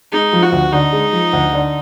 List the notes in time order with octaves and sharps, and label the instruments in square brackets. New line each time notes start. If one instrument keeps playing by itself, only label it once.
[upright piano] G#3 [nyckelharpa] D#4
[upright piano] F3
[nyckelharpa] F#4
[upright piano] D2
[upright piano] D3 [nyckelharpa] D#4
[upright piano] G#3
F3
D2
D3